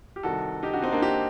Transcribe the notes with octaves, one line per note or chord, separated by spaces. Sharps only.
G4
C2 C3 D#3 F#4 A4
D#4 G4
D4 F#4
C4 D#4
A#3 D4
D#4 G4